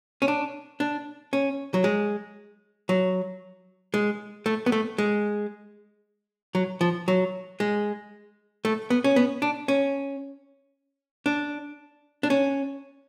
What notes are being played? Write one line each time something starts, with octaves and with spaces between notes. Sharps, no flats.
C#4
D4
D4
C#4
F#3
G#3
F#3
G#3
A3
B3
A3
G#3
F#3
F3
F#3
G#3
A3
B3
C#4
B3
D4
C#4
D4
D4
C#4